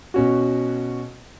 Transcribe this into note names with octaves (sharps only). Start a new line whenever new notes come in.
B2 C#4 F#4